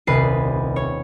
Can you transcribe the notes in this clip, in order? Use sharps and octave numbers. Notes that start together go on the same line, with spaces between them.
D#1 C2 B4 C7
C#5